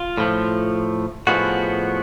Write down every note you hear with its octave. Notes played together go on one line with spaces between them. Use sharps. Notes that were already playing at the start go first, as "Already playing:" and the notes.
Already playing: F4
A2 F3 A3
A2 F3 G#3 B3 F#4